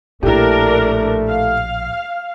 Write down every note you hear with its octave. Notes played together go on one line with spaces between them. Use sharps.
A#1 A2 A3 D4 E4 G4 A#4
F5